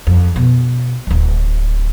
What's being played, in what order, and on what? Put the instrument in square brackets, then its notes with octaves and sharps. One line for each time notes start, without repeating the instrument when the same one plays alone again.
[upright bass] F2
B2
D1 G#1